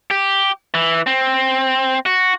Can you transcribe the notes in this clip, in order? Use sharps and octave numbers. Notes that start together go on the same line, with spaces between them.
G4
E3
C4
F#4